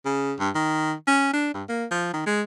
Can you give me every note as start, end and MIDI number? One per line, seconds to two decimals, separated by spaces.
0.05 0.34 49
0.39 0.50 43
0.55 0.93 51
1.07 1.33 61
1.33 1.52 62
1.54 1.63 43
1.69 1.85 58
1.91 2.10 53
2.13 2.24 51
2.26 2.42 56